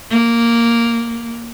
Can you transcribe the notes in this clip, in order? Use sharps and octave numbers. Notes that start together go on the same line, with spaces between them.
A#3